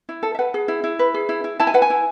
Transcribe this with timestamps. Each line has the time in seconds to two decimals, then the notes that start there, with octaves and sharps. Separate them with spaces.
0.09 E4
0.23 A4
0.35 E5
0.39 B4 F#5
0.54 G#4
0.68 E4
0.84 E4
0.99 B4
1.14 G#4
1.29 E4
1.44 E4
1.59 E4 A5
1.67 G#5
1.74 B4 F#5
1.82 G#5
1.90 E4